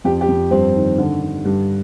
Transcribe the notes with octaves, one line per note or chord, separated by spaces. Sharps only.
F2 G4
G4
F2
G2 C4
D#3
D3
D3
G2